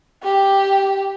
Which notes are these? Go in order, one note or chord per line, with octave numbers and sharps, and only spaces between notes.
G4